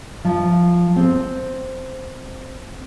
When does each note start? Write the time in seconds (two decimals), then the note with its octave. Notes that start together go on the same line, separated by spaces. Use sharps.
0.25 F3
0.96 C4